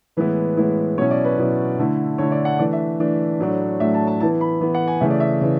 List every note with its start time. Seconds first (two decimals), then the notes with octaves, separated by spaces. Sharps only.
0.17 A2 E3 G#3 B3 E4 B4
0.57 A2 E3 G#3 B3 E4
0.98 B2 F#3 C#4 E4 C#5
1.11 D5
1.25 B4
1.38 B2 F#3 C#4 E4
1.79 D3 A3 E4
2.18 D3 A3 E4 C#5
2.32 D5
2.45 F#5
2.59 E3 A3 D4 D5
2.73 E5
3.00 E3 A3 D4
3.40 A2 F#3 A3 D4
3.80 A2 F#3 A3 D4 E5
3.94 A5
4.07 A5
4.20 E3 B3 E4 A5
4.41 B5
4.60 E3 B3 E4
4.75 F#5
4.88 G#5
5.01 C#3 E3 A3 E5
5.10 D5
5.20 E5
5.41 C#3 E3